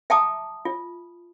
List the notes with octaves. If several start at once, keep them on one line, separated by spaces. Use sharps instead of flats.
E5 G5 A5 A#5 D6 D#6
F4